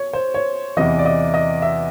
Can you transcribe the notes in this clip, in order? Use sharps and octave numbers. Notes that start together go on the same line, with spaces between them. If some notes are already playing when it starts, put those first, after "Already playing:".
Already playing: C#5
C5
C#5
E2 C3 E3 D#5
D5
D#5
D#5
E5